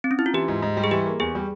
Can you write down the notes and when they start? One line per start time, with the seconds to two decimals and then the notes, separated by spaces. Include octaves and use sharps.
0.04 C4
0.11 C#4
0.19 E4
0.26 F4
0.34 E3 G4
0.48 G#2
0.62 G#2
0.77 G3
0.84 G#4
0.91 E3 G4
1.06 A#3
1.20 E2 G#4
1.35 G3